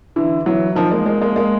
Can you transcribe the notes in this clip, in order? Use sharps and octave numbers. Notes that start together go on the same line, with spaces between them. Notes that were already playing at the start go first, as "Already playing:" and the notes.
D3 E3
E3 F#3
D#3 F3
G#3 A#3
G#3 A#3
G#3 A#3
G#3 A#3